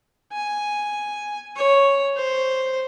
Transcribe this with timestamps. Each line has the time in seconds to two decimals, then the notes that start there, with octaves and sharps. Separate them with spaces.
0.32 G#5
1.56 C#5
2.16 C5